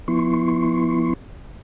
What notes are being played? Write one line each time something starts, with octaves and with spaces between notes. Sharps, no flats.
F3 B3 E4 C6 C#6